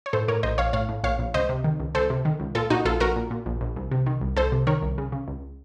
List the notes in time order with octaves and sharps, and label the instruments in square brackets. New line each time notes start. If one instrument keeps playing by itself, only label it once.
[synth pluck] C#5
A2 A4 C5
A2 A#4 C#5
A#1 C5 D#5
A#1 C#5 F5
A2 C#5 F5
A2
A#1 C#5 F5
A#1
C#2 C5 D#5
C3
D#3
C#2
C#2 A4 C5
C3
D#3
C#2
A#2 F4 A4
A#2 D#4 F#4
A#1 F4 A4
A#1 F#4 A#4
A#2
A#2
A#1
A#1
C2
C3
D#3
C2
C2 A4 C5
C3
D#3 A#4 C#5
C2
C#3
C#3
C#2